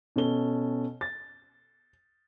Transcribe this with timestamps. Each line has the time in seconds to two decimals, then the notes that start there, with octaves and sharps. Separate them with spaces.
0.16 B2 C#4 A4 G7
1.01 A6